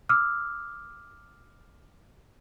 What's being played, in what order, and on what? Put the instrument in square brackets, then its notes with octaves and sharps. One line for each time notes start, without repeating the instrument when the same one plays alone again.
[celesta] D6 E6 F6